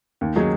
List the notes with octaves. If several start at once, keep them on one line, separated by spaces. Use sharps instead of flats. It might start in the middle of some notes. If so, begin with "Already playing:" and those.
D#2
D#3 F#3 D#4 G#4